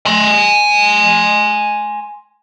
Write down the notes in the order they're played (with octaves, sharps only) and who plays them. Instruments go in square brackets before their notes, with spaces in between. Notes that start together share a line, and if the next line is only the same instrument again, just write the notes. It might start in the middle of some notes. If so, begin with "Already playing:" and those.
[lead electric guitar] G#5 C6